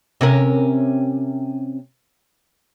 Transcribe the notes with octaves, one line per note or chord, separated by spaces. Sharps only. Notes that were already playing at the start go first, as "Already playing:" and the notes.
C3 C#4 A#4